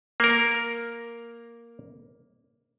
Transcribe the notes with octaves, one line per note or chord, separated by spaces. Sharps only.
A#3 A#4